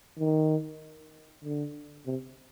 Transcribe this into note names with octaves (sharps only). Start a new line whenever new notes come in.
D#3
D3
C3